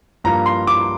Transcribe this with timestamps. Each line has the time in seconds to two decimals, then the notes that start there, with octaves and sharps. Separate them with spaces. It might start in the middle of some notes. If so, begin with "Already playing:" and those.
0.24 G2 F3 A#3 A#5
0.46 C6
0.67 D6